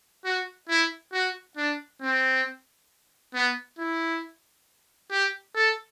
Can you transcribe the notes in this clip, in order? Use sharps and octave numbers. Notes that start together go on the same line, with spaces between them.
F#4
E4
F#4
D4
C4
B3
E4
G4
A4